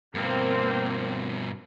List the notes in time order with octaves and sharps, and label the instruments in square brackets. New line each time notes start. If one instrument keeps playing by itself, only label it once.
[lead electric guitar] G2 B2 [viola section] A#3 C4